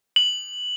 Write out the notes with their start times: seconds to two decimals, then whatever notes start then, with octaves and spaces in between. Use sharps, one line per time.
0.16 F#7